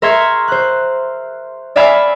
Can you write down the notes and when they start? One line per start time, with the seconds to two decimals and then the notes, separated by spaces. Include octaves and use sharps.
0.02 A#4 E5 C6 C#6 G#6
0.48 C5 F#6
1.76 D5 E5 F5 G#5 B5